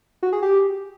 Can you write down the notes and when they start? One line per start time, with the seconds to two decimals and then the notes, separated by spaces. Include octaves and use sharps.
0.23 F#4
0.33 G#4
0.42 G4